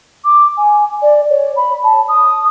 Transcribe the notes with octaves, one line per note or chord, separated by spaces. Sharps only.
D6
G#5
D5
C#5
B5
A5
D#6